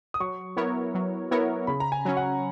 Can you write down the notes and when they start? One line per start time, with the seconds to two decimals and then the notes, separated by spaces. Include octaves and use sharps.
0.14 D#6
0.20 F#3 C#6
0.57 B3 E4 A#4 C#5
0.95 F#3
1.31 B3 E4 A#4 C#5
1.67 C#3 B5
1.80 A#5
1.92 G#5
2.05 F#3 C#4
2.17 F#5